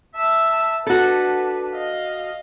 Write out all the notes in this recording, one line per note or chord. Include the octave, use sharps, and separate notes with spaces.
E5 A5
D4 F#4 A4 B4
D#5 F5